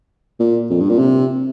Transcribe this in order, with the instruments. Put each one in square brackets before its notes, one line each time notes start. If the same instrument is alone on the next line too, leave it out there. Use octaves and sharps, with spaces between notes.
[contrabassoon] A#2
F2
G2
A#2
C3